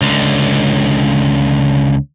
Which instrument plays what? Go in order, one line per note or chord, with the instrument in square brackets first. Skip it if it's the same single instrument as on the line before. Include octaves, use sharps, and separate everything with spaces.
[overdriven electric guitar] C#2 D3